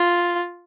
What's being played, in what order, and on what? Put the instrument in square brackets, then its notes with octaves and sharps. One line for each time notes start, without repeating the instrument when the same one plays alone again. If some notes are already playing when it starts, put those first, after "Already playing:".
Already playing: [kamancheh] F4